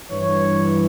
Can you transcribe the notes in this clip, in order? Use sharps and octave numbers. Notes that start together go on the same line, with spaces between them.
G2 E3 C#5